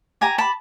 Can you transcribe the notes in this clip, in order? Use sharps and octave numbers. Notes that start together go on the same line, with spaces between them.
G4 G#5 A#5
A5 B5